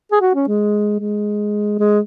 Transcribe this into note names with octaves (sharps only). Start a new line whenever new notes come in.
G#4
F#4
C#4
G#3
G#3
G#3